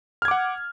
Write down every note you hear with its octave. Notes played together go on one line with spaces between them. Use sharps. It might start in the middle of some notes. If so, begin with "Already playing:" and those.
F#5 D6 F6 G#6